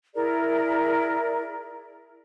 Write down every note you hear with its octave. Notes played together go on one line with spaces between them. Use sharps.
E4 G#4 A#4 D5